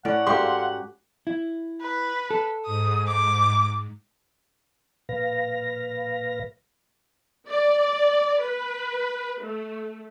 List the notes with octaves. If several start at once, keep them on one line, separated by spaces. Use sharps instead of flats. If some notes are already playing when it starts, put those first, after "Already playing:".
A2 C#4 D5 F#5
G#2 F#4 G4 A4 F5 C6
E4
B4
A4
G#2 D#6
D6
A#2 B4 F5 A#6
D5
B4
A3